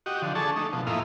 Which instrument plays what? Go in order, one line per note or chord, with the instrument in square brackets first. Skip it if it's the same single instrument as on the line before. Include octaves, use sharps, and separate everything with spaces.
[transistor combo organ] F#4 G4 D#5
D3 F3
D4 G#4 A4 A5 C#6
A3 D#4
B2 F3
F2 A2 A#3 E4 D#5 F5